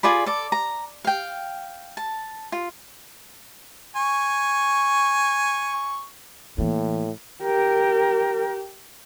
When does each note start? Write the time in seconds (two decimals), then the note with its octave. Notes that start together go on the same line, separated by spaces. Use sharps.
0.03 F4 G#4 D5 B5
0.26 A4 D5
0.52 A#5
1.04 F5 G5
1.97 A5
2.52 F4
3.96 G#5 C#6
6.58 A2 E3 A#3
7.43 G4 A#4